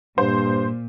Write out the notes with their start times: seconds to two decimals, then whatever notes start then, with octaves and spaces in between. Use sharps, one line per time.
0.18 G2 A#2 C5